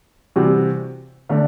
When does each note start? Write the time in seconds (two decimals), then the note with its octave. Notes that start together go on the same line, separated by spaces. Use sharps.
0.36 C3 E3 G3 C4 F#4
1.29 D3 A3 D4